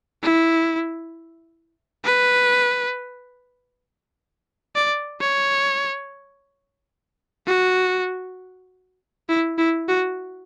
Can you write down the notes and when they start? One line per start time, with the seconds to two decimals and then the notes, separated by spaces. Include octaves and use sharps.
0.23 E4
2.05 B4
4.75 D5
5.21 C#5
7.47 F#4
9.29 E4
9.58 E4
9.89 F#4